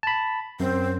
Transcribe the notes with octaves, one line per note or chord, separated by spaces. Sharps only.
A5 B5
F#2 C4